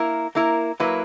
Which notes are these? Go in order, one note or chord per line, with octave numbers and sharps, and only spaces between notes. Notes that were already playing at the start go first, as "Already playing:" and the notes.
Already playing: A#3 E4 A#4
A#3 E4 A#4
F#3 A#3 E4 B4